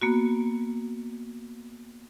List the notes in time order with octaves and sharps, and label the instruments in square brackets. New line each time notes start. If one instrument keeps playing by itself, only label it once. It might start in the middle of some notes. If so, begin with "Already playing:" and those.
[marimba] A#3 B3 F#4